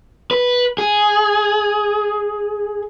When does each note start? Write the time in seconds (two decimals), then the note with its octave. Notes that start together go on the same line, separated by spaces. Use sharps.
0.31 B4
0.78 G#4